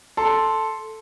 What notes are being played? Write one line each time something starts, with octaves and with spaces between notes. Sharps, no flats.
A4 C6